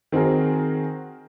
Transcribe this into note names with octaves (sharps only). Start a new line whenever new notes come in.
D#3 C4 F#4 G#4 A#4